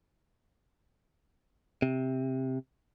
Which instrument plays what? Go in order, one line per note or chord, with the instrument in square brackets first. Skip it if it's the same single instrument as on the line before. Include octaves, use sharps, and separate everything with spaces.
[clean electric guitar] C3